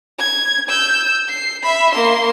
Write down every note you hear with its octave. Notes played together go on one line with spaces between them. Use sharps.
G#6
E6 G6
C7
E5 B5
A#3 C6